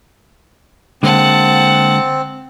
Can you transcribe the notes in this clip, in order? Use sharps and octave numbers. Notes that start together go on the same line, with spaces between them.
D3 G#3 A#3 C4 F#5 A5